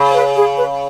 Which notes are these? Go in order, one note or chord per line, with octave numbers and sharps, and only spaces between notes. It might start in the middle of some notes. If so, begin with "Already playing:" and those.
Already playing: C#3
C#5
B4
G#4
B4